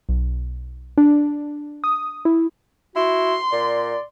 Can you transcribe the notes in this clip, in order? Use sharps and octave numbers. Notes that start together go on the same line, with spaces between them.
B1
D4
D#6
E4
E4 F#4 C6
A#2 D5